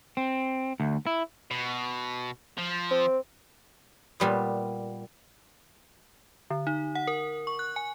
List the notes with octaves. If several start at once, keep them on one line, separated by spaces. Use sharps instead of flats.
C4
D2
E4
B2
F3
C4
A#2 G3 B3
D3
D#4
F#5
A#4
C#6
F#6
G#5